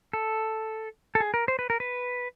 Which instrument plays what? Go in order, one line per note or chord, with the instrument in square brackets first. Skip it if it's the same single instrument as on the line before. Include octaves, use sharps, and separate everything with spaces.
[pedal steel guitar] A4
A4
G#4
A#4
C5
B4
A#4
B4